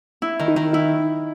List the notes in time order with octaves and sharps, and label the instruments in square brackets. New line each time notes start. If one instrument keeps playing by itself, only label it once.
[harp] E4
D#3
[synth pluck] D#4
[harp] D#3
[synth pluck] D#4 [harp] E4